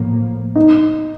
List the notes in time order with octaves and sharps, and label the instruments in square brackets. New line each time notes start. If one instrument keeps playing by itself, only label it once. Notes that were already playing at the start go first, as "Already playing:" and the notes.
Already playing: [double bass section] A2 F3 A#3
[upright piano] D#4